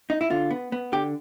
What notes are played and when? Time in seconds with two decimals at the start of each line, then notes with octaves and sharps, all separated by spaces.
0.10 D#4
0.21 E4
0.30 D3 F4
0.51 B3
0.72 B3
0.92 D3 G4